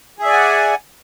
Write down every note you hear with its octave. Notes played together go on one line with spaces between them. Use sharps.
G#4 D5 E5 F#5 G#5